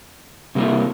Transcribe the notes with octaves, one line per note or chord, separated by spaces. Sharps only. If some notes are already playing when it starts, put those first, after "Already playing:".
C3 G3 A#3 E4